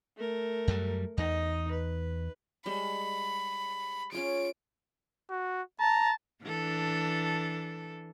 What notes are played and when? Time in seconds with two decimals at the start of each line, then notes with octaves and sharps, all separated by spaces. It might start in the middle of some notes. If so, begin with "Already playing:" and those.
0.17 A3 A#4
0.68 F#2 F#3 G3
1.18 E2 D#4 D#5
1.71 B4
2.66 G3 G#3 B5
4.12 C#4 F4 G#4 D7
5.30 F#4
5.80 A5 A#5
6.43 E3 D4 A4